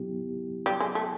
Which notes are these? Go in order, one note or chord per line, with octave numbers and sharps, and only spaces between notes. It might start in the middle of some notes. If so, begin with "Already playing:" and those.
Already playing: F#3 B3 E4 G4
G3
G#3
A3